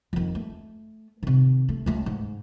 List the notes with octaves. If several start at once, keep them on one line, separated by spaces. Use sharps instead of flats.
F2 D#3
A3
C3 D#3
A3
C#2 A3
G#2